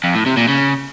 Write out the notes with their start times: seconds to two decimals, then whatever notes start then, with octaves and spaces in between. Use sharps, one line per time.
0.04 F2
0.15 A2
0.26 C3
0.37 A#2
0.48 C#3